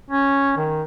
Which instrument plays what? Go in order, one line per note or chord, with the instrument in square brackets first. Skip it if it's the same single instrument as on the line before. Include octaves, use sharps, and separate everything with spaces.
[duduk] C#4
D#3